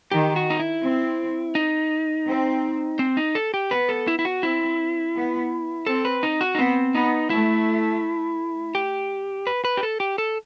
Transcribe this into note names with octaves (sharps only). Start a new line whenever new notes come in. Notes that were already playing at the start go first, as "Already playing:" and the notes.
D#3 G4
F#4
D#4
E4
C4
D#4
C4
C4
D#4
A4
G4
B3 B4
A4
E4
E4
F#4
C4 E4
B3
C4 A4
B4
D#4
F#4
D#4
B3 C4
B3 D#4
A3 E4
G4
B4
B4
G4
A4
G4
A4